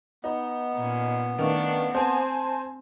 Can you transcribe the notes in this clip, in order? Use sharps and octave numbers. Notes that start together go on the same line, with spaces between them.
B3 D#4
A#2 C#4
D#3 A3 C#4 D4 B4 F5
C4 C5 G#5 A5